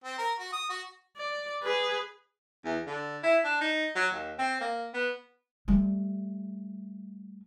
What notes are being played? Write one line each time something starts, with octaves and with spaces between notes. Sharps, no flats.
C4
A#4
F#4
D#6
F#4
D5
G#4 B4
E2
D3
E4
D4
D#4
F#3
D#2
C4
A#3
B3
G3 A3